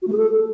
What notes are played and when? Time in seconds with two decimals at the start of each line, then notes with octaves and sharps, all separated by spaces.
0.02 F#4
0.07 A3
0.12 G#4
0.17 A4